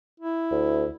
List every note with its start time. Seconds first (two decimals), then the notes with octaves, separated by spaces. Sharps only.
0.20 E4
0.51 D2